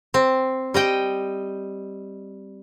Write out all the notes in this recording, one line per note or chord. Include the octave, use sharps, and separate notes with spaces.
C4
G3 D#5 G5